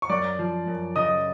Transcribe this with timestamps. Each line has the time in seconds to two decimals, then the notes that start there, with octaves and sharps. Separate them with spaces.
0.02 C#6
0.09 F#2 D5 D6
0.39 F3
0.67 F#2
0.96 C#3 D#5 D#6